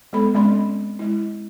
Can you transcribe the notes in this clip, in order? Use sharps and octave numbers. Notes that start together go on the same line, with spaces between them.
G#3 B3 A4 B5
G#3 C4 C#4 D5 B5 C6
G#3 E4